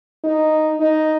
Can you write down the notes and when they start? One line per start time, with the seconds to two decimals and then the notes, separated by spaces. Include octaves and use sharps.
0.24 D#4
0.80 D#4